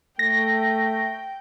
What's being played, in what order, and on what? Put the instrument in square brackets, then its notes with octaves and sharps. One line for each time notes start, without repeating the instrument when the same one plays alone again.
[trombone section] A3 [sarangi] G5 [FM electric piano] A#6